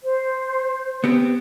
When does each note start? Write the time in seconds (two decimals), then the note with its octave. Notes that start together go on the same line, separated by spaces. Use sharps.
0.04 C5
1.04 B3 C4 G4